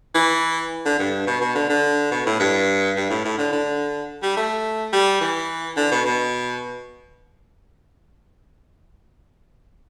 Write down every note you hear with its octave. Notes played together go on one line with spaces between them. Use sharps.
E3
D3
G2
B2
B2
D3
D3
B2
A2
G2
G2
A2
A2
D3
D3
G3
A3
G3
E3
D3
B2
B2